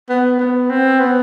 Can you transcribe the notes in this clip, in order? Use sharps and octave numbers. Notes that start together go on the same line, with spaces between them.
B3
B3
C4
B3